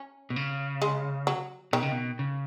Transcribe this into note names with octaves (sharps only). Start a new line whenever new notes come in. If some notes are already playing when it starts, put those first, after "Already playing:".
Already playing: C#4
B2
C#3
G#3
F#3
B2 D#3
C#3
B2
C#3